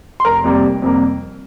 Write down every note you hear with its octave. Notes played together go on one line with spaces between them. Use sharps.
C6
F1 A#4 A#5
F2 C3 G3 A#3
F1
F2 C3 G3 A#3